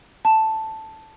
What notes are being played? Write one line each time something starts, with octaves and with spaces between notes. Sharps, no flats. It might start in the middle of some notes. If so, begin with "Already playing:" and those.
A5